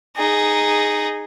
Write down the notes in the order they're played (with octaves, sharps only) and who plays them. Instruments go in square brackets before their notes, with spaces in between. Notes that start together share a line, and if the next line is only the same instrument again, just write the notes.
[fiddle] D#4 G#4